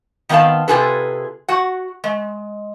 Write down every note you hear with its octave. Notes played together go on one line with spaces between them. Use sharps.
D#3 B3 C4 C#5 F5 A5
C3 D#3 F4 G#4 A4 B4
F#4 F#5
G#3